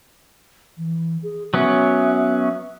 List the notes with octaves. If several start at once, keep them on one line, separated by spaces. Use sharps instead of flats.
E3
G#4
F#3 B3 C#4 E5